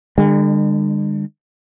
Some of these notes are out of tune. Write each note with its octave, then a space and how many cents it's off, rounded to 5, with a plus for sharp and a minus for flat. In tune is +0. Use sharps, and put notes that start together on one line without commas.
D3 +35 G#3 -45